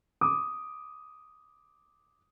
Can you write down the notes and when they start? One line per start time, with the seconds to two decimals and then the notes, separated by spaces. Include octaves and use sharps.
0.21 D6 D#6